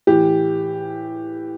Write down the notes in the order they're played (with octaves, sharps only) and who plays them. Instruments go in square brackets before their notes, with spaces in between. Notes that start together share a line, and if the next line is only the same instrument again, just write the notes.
[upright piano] A2 E3 G4